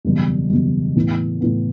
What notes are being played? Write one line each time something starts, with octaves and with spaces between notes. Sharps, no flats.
F#1 E2 B2 G3
F#1 E2 B2 G3
A2 E3 B3
A2 E3 B3